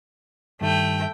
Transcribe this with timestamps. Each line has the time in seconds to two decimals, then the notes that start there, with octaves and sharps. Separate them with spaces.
0.61 G2 D#3 A3 G5